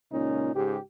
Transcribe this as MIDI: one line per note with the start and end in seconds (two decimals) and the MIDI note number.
0.11 0.54 37
0.11 0.54 46
0.11 0.54 61
0.11 0.54 63
0.54 0.78 37
0.54 0.78 44
0.54 0.78 67